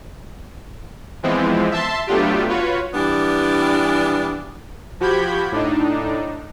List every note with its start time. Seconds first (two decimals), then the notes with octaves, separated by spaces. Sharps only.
1.23 E3 F3 G#3 B3 C4
1.71 E5 A5 C6
2.07 F#3 A3 B3 D4 F4 G4
2.49 F4 F#4 B4 C#5
2.94 E3 G3 B3 D4
5.00 F3 F#4 G4 B5 G6 G#6
5.52 A2 D4 D#4